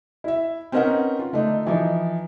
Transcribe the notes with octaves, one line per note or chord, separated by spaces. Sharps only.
E4 E5
C4 C#4 D#4 A#4 B4 F#5
F4
D3 A3 D4 D#4
E3 F3 D#4